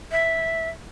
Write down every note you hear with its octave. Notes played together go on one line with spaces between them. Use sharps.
E5